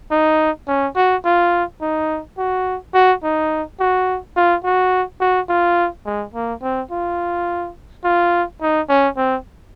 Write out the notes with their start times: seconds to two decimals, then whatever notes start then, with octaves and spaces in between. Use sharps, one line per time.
0.11 D#4
0.67 C#4
0.96 F#4
1.25 F4
1.81 D#4
2.38 F#4
2.94 F#4
3.23 D#4
3.80 F#4
4.36 F4
4.64 F#4
5.20 F#4
5.49 F4
6.05 G#3
6.34 A#3
6.62 C4
6.91 F4
8.04 F4
8.61 D#4
8.89 C#4
9.17 C4